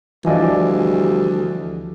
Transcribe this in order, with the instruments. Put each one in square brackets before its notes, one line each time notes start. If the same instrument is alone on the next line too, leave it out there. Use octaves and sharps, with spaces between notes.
[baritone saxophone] D2 [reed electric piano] E3 F3 [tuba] G3 [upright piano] D5 D#5 G#5